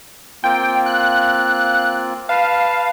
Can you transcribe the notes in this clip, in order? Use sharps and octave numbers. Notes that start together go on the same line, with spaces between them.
A#3 C4 F4 G5
F#6
B4 F5 A5